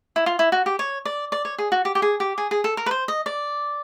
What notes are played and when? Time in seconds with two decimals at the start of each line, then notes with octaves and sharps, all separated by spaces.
0.16 E4
0.26 F4
0.39 E4
0.52 F#4
0.66 G4
0.79 C#5
1.05 D5
1.32 D5
1.45 C#5
1.58 G#4
1.72 F#4
1.85 G4
1.95 G4
2.02 G#4
2.20 G4
2.38 G#4
2.51 G#4
2.64 A4
2.77 A#4
2.86 B4
2.91 C5
3.08 D#5
3.26 D5